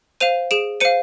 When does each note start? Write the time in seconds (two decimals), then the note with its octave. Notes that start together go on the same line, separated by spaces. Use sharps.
0.20 C5 F5 D#7 F7
0.51 G#4 D7 E7
0.80 C5 F5 C#7 D#7